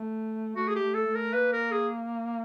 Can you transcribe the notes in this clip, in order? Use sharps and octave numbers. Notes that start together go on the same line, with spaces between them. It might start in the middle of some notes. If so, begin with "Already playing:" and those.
Already playing: A3
A3 F#4
G#4
G4
A3
A4
A3
A#4
A#3 B4
A#4
G#4